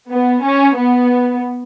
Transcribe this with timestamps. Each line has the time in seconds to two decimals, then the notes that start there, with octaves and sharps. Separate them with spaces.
0.10 B3
0.43 C#4
0.77 B3